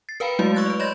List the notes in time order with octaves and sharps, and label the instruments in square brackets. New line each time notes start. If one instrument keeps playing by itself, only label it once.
[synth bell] A6 C7
A#4 B4 F5 G5 A#5 B5
F#3 G#3 A3 E4 F#4 F5
C#6 E6 F#6 G#6 A6
B4 D5
C#5 D#5 B5 C6 G6 A#6